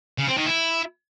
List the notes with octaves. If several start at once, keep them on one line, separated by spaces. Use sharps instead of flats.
C#3
C4
D#3
E4